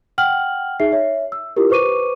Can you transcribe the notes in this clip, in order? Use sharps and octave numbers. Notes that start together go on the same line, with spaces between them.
F#5 G5 F6 F#7
D#4 G#4 E5 C7
C#5 E5
E6
E4 F4 G4 A#4
B4 C5 C#6 D6 D#7